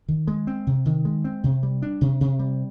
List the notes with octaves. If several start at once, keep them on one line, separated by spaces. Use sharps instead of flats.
D#3
G#3
C4
C3
D#3
G#3
C4
C3
G3
D4
C3
C3
G3